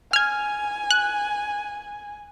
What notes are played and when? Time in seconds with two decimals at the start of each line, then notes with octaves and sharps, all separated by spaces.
0.13 G#5 F6 G#6
0.91 F#6